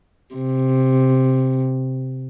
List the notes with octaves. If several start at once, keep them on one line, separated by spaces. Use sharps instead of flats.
C3